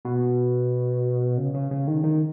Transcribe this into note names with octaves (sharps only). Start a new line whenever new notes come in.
B2
C#3
C#3
C#3
D#3
D#3